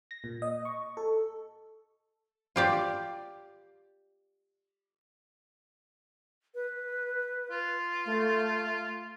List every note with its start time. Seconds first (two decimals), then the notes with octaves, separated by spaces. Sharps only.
0.11 A#6
0.24 A#2
0.42 D#5
0.65 C#6
0.97 A4
2.56 F4 G4 D5
6.55 B4
7.51 F4
8.06 A3